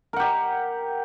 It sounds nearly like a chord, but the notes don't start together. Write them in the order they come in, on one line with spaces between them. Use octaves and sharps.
A#4 F#5 G4